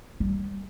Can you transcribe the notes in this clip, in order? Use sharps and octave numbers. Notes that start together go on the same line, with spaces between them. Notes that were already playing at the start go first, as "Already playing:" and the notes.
G3